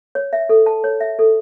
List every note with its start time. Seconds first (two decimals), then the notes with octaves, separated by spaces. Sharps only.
0.15 C#5
0.33 E5
0.49 A4
0.66 A5
0.84 C#5
1.00 E5
1.19 A4